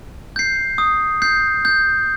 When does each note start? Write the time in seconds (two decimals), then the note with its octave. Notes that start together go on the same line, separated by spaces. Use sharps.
0.36 G6 C7
0.78 D#6
1.22 G6 C7
1.65 G6